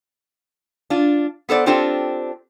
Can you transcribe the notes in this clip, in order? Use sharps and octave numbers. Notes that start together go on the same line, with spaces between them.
D4 F4
B3 A4 C5 D5
C4 D4 F4 G4 A4 C5